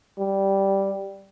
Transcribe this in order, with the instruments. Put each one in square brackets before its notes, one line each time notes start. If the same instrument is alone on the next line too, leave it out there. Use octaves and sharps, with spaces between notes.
[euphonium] G3